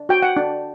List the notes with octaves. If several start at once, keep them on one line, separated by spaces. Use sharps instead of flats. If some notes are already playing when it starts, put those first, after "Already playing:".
Already playing: D4
F#4 G5
F#5
D4